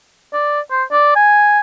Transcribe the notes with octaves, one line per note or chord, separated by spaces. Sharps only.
D5
C5
D5
G#5